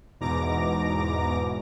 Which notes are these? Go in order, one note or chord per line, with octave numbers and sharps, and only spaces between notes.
E2 G#2 B2 A#5 D6 A#6